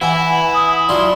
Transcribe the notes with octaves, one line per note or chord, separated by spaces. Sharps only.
E3 E4 F#5 G#5
D#6
F#3 D4 F4 C6